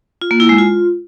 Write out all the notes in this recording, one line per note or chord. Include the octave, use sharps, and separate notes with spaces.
F4
A#3
E4
G#3
F4